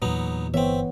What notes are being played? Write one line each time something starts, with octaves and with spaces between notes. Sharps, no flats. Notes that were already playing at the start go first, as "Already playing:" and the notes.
E2 A#2 F#3 B3 D#4
G1 E3 B3 C4 C#5 E5